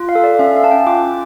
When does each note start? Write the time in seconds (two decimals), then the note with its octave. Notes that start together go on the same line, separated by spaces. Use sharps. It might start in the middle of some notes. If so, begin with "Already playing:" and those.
Already playing: F4
0.09 F5
0.15 A4
0.24 D5
0.39 C#4 E5
0.56 F5
0.64 C#4 A5
0.71 G5
0.87 F4 D6